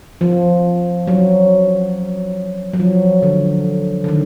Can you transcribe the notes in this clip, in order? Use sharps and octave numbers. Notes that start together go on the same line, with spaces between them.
F3
F#3
F#3
F3
D3
D3
D#3